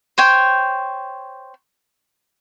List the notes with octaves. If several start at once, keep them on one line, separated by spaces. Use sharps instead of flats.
C5 C#5 G5